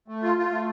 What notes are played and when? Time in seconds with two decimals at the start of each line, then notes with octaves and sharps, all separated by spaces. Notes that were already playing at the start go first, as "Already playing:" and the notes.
0.08 A3
0.22 F4
0.37 F4
0.51 A3